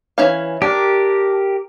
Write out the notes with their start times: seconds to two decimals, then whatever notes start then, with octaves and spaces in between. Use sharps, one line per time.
0.18 E3 C#4 F5
0.62 D4 G4 A#4